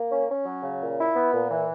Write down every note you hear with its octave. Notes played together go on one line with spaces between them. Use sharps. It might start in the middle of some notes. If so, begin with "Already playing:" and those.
Already playing: A#3
C#4
C#4
F#3
C#3
A#2
E4
B3
A#2
E3